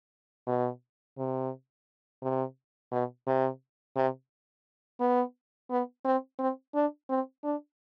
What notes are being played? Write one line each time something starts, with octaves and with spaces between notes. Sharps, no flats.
B2
C3
C3
B2
C3
C3
B3
B3
C4
C4
D4
C4
D4